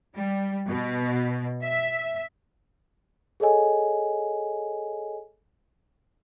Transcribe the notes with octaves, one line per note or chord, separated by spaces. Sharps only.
G3
B2
E5
G#4 A4 C#5 D#5 G#5